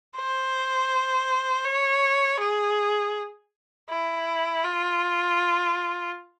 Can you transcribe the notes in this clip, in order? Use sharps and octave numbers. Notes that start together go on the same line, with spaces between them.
C5
C#5
G#4
E4
F4